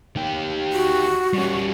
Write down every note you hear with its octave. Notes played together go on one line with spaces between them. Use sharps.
D#3 G4
F#4
G3 C#4